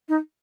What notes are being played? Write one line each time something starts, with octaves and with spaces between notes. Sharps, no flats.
D#4